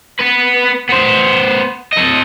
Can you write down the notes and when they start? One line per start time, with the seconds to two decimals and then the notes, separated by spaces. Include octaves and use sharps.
0.19 B3 B4
0.89 B3 C5
1.93 A4 D#5